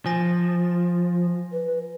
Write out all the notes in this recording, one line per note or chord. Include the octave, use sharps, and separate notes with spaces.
F3 G#5 A#6
B4